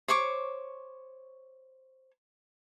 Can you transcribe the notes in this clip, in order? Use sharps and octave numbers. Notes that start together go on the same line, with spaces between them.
C5 C#5 C#6 D6